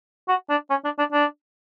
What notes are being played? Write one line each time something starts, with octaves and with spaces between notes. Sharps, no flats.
F#4
D4
C#4
D4
D4
D4